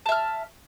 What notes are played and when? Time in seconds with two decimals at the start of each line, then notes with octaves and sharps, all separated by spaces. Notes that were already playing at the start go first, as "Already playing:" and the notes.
0.06 A5
0.09 E5
0.12 F6